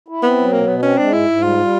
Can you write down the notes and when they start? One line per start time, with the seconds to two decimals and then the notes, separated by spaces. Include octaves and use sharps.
0.08 E4
0.23 B3 C4
0.38 F#3
0.52 B2 A#3
0.67 B2 B3
0.82 C4 C#4
0.98 G#3 D4
1.13 G#2 E4
1.28 G#2
1.43 G3 F4
1.58 G3